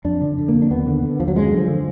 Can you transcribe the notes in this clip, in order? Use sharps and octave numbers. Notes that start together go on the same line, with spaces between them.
F2 D4
D3
D3
A#3
F2
D4
D#2 B3
D3
D3
D#2 F3
F#3
F#2 G#3
D3
F3
D3